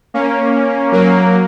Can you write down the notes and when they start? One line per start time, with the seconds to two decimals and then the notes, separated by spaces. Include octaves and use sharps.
0.14 A#3 C#4
0.92 F#3 A#3